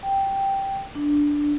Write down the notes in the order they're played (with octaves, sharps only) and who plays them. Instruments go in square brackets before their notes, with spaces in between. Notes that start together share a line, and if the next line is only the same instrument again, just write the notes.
[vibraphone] G5
D4